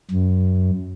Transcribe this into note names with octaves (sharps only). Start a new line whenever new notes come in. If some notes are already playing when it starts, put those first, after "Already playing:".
F#2